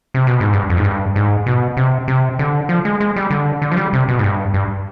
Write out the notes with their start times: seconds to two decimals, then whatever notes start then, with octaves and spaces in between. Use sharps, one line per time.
0.14 C3
0.27 B2
0.40 G#2
0.53 G2
0.70 F2
0.77 G#2
0.84 G2
1.16 G#2
1.46 B2
1.77 C3
2.08 C3
2.39 D3
2.69 F3
2.85 G#3
3.00 G#3
3.16 G3
3.30 D3
3.62 D3
3.72 F3
3.77 G3
3.93 C3
4.08 B2
4.19 G#2
4.24 G2
4.54 G2